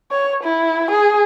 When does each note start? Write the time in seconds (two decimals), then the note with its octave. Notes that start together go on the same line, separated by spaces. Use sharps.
0.12 C#5
0.43 E4
0.91 G#4